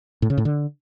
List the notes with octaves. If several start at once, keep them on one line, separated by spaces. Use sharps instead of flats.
A2
C#3
A2
D3